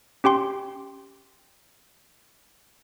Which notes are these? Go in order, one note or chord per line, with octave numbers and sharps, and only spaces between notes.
C#4 G4 G5 C6